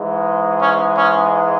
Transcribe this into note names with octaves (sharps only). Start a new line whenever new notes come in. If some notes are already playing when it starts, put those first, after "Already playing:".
Already playing: G#2 E3 G#3
C#4
C#4